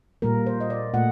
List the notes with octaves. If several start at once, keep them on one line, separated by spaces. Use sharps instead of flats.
A#2 G3 A#3 A#4
C5
D#5
D5
A#2 A3 F#5